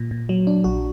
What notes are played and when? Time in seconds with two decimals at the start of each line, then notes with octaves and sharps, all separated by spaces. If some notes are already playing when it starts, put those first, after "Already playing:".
Already playing: A#2
0.11 A#2
0.29 F#3
0.47 D4
0.64 A#1 F#4